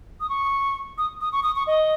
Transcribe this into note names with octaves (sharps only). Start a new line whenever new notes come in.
D#6
C#6
D#6
D#6
C#6
D#6
C#6
D#5